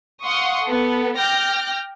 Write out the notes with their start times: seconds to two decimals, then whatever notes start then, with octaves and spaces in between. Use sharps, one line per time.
0.22 F5 F#5 C6 C#6 D#6
0.64 B3 A4
1.17 G5 D6 F6 G6 A#6